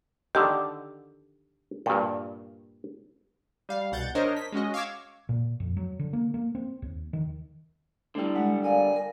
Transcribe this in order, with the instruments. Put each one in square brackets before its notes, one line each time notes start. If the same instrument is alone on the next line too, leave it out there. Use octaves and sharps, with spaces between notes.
[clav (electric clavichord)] D3 D#3 [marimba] G4 D6 E6
[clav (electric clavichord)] G2 A#2 [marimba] G5
[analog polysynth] G3 F5
C2 B2 F#5 G6 A6
D4 A#4 C5 C#5 D#5
B6
G#3 C#4 F#4 D#5
F5 C#6 D6 E6 G#6
[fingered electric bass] A#2
F2
F#3
D3
A#3
A#3
C4
D#2
D#3
[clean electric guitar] D3 G3 [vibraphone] A3 E4
[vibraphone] G#3 [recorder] F#5
[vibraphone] A#4 D5 F5 [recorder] G#5
[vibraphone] A#4